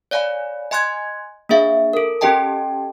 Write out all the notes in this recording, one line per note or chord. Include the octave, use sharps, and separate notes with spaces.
C#5 D5 F5 G#5 B5
D#5 G#5 C6 F#6 G#6
A#3 D4 G#4 E5 F5
A4 A#4
C#4 G4 A4 D#5 G5 A5